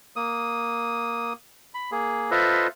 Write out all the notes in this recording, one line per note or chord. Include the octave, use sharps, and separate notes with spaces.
A#3 D#6
B5
A#3 G#4
F4 A4 B4 C5 D#5 E5